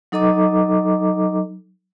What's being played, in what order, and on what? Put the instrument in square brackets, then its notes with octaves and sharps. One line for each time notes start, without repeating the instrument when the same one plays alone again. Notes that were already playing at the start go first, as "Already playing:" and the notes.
[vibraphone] F#3 D#4 A4 D#5 A#5 D6